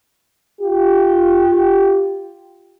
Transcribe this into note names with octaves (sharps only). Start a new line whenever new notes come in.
F4 G4